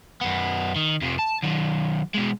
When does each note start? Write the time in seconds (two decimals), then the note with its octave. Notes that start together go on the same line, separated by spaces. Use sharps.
0.21 F#2 B3
0.76 D#3
1.01 F2 C3
1.19 A5
1.43 D#3 F#3
2.14 B2 G#3